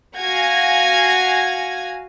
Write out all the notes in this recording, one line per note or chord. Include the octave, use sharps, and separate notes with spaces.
F#4 F5 G#5 G#6 A#6